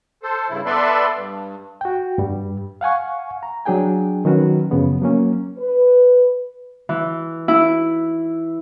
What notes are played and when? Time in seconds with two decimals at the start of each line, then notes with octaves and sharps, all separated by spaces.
0.23 A4 C5
0.49 G2 C#3 E4
0.66 B3 A4 B4 D5 E5 C6
1.15 G2
1.81 F#4 G5
2.18 G2 G3
2.81 F5 F#5 G#5 C#6
3.43 A#5
3.65 F#3 D4 G#4 G5 G#5
4.25 D#3 F#3 C#4 F#4 B4
4.71 F#2 C#3 F3 B3
5.02 F#3 A#3 C#4
5.59 B4
6.89 E3
7.48 E4